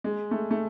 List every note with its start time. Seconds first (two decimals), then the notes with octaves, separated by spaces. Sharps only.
0.04 G#3
0.31 A3
0.51 A3